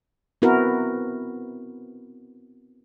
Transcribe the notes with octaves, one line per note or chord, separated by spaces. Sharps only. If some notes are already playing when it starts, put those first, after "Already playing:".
B3 C4 E4 F#4 A#4 B4